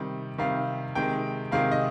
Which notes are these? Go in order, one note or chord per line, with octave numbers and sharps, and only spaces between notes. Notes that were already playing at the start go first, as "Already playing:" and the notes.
Already playing: C3 D#3 G3
C3 D#3 G3 F5
C3 D#3 G#3 G5
C3 D#3 G#3 F5
D#5